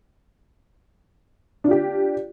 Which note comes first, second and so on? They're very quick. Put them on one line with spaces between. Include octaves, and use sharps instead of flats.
D4 F4 G4